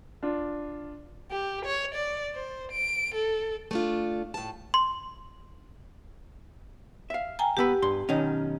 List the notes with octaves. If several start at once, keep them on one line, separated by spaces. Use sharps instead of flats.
D4 F4
G4
C#5
D5
C5
D7
A4
A3 D4 F4
A2 A5
C6
E5 F5
G5 G#5 A#5
C2 B3 G4 B4 E6
G2 C6
B1 D#3 C#4 D#5